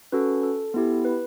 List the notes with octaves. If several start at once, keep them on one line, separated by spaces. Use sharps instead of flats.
C#4 F#4 A4 B4
A4
B3 E4 G4
B4